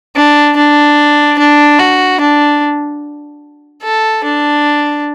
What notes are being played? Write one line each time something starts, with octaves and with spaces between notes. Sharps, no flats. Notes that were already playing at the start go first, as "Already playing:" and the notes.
D4
D4
D4
F#4
D4
A4
D4